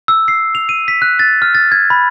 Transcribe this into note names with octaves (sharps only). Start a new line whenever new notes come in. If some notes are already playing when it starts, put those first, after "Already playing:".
E6
C7
F7
D#7
B6
F#6
A6
F6
A6
G#6
B5